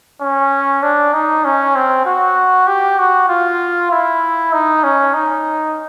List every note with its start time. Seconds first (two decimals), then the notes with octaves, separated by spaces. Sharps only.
0.21 C#4
0.83 D4
1.14 D#4
1.45 C#4
1.76 C4
2.06 F#4
2.67 G4
2.99 F#4
3.29 F4
3.91 E4
4.53 D#4
4.83 C#4
5.14 D#4